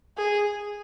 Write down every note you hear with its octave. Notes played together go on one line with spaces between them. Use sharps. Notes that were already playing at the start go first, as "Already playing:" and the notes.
G#4